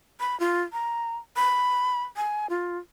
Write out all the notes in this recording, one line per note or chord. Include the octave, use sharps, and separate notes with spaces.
B5
F4
A#5
B5
G#5
F4